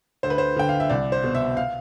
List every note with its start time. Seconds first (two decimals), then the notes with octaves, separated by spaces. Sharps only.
0.23 D2 C5
0.30 B4
0.38 C5
0.56 D3 G5
0.69 F5
0.80 E5
0.90 C2 D5
1.12 C5
1.24 B2
1.35 E5
1.57 F5